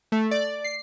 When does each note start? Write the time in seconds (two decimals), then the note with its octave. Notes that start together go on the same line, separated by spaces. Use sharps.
0.12 A3
0.31 D5
0.64 C7